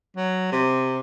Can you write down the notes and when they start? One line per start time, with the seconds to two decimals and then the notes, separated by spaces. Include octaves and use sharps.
0.17 F#3
0.52 C3